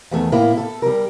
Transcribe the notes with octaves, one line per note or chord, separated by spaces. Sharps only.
E2 D#3 A3
A2 A#3 E4
A4
G3 A#4